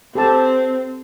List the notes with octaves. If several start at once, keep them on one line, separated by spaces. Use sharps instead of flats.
C4 G4 A4 A5